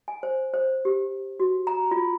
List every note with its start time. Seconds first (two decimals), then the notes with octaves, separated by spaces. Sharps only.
0.08 G#5
0.23 C5
0.54 C5
0.85 G4
1.40 F#4
1.67 A#5
1.91 F4